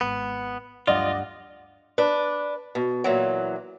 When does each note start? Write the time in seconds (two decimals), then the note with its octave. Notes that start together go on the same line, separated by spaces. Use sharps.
0.01 G#1 G#3 B3
0.87 D2 G2 F3 F#3 F4 D5 D#5 F#5
1.98 D4 B4
2.75 B2
3.04 A#2 E3 F#3